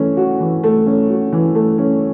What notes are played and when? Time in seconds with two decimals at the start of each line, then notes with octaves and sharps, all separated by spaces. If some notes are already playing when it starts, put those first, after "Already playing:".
Already playing: E3 A3 C#4
0.17 F#4
0.40 E3
0.64 A3
0.86 C#4
1.09 F#4
1.33 E3
1.55 A3
1.78 C#4